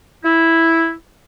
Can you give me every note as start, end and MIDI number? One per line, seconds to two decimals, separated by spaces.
0.24 0.92 64